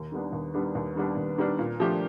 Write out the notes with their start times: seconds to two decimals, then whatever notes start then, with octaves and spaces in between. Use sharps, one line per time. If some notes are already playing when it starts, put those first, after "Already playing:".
Already playing: D#2
0.12 D#3 G3 B3 D4
0.33 D#2
0.54 D#3 G3 B3 D4
0.75 D#2
0.96 D#3 G3 B3 D4
1.17 D#2
1.38 D#3 G3 B3 D4
1.59 A#2
1.80 F3 A3 D4 G4